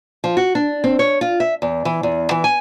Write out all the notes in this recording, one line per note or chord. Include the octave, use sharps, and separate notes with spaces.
F3
F#4
D4
C4
C#5
F4
E5
E2
E3
E2
E3
G#5